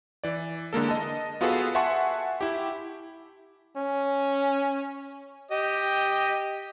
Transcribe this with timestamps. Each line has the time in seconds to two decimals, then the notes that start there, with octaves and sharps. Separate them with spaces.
0.24 E3 D5
0.73 D3 G#3 A#3 A4
0.89 D#5 A5
1.41 B3 F4 F#4 G#4 A4 B4
1.75 E5 F#5 G#5 A5 C6 C#6
2.41 E4 G4
3.76 C#4
5.51 G4 D#5